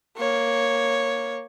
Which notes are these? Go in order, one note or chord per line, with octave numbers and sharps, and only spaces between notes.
A#3 C#5